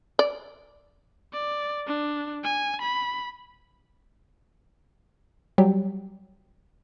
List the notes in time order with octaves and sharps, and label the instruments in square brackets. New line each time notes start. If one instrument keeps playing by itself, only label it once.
[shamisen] D5
[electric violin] D5
D4
G#5
B5
[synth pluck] F#3 G3 G4